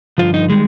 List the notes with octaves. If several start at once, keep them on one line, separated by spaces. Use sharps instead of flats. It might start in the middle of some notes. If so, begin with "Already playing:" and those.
G2 D3 F3 F4
D#4
D#3 G3 G#3